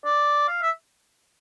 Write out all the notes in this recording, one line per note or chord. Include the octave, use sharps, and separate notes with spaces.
D5
F5
E5